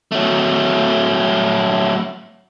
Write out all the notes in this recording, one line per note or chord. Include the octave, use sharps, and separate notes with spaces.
F#3 A3